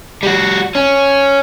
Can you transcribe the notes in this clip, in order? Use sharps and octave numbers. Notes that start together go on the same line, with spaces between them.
G3 F#4
C#4